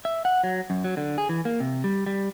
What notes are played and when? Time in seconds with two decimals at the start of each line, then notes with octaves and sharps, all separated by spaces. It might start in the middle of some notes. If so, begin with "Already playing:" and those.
0.05 E5
0.25 F#5
0.44 F#3
0.70 F#2
0.84 F#3
0.97 D3
1.18 G#4
1.29 E3
1.45 A#3
1.60 C3
1.84 G3
2.06 G3